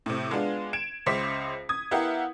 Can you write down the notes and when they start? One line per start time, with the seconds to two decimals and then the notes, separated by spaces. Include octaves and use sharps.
0.06 A2 C3
0.31 G#3 B3 D4 F4
0.73 G#6 D7 E7
1.06 C#2 C#3 C5 E5 D6 B6
1.69 D#6 G#6
1.91 B3 E4 G4 A#4 F5 F#5